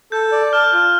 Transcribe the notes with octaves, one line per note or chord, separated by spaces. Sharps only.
A4 G6
D5
A5 F6
G6
F4 F6